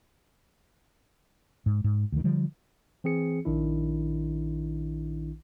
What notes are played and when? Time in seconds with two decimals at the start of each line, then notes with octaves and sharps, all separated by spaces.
1.66 G#2
1.84 G#2
2.12 D2 D#3
2.24 D3 F3 G3
3.04 E3 C4 G#4 C#7
3.45 A#1 D#3 D4 E4